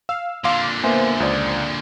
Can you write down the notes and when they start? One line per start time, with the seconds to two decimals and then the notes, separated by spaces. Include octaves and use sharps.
0.09 F5 E6
0.44 A#2 D3 F5 C6 D6
0.84 A#3 B3 C5 E5 G#5
1.20 C#2 D5 D#6